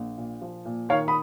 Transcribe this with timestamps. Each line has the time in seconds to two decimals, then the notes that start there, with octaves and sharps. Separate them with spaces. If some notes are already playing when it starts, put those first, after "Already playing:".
Already playing: A#1
0.18 A#2
0.42 F3
0.65 A#2
0.89 D#3 C#5 F5
1.08 B5 D#6